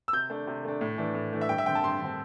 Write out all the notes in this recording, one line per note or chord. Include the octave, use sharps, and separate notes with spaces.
E6
C3 G6
A3 D4
C3
A3 D4
A2
E3 A3 D4
A2
E3 A3 D4
E5
G2 G5
E5
D3 C4 G5
A5
G2 C6
D3 C4